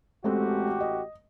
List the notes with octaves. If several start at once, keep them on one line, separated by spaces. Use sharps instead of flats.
A1 G#3 A3 C4 F#4 G4
D#5